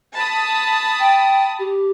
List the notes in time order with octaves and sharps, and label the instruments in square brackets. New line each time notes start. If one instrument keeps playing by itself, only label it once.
[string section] A5 B5 D#6
[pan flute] G5
G4